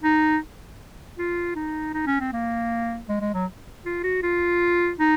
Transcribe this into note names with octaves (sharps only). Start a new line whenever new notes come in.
D#4
F4
D#4
D#4
C#4
C4
A#3
G#3
G#3
F#3
F4
F#4
F4
D#4